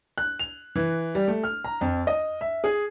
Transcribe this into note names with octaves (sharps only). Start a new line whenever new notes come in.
F#6
F7
E3
G3
A3
F6
A#5
F2
D#5
E5
G#4